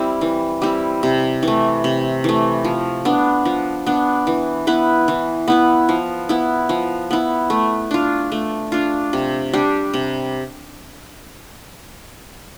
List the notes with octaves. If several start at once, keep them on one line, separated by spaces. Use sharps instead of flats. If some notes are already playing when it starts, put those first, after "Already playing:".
Already playing: G3 C4 E4
E3
G3 C4 E4
C3
E3
A3
C3
E3 A3
F3
B3 D4
F3
B3 D4
E3
B3 E4 B4
E3
B3 E4 B4
F3
B3 E4
F3
B3 E4
A3
D4 F4
A3
D4 F4
C3
G3 D4 G4
C3